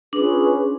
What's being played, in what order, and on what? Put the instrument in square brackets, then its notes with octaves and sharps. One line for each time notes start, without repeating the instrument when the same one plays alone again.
[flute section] C#4 F4 G#4 B4 [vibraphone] D4